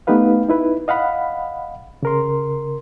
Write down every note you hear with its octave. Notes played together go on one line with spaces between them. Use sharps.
A3 B3 D#4 G4 B4 F5
D#4 E4 B4
D#5 F5 F#5 B5
C#3 A#4 C6